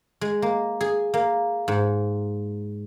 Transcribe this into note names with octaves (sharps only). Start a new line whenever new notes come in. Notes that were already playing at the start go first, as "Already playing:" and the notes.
G#3
A#3
G#4
A#3
G#2